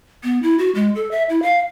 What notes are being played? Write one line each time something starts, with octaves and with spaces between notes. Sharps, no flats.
B3
E4
F#4
G#3
A4
E5
E4
F5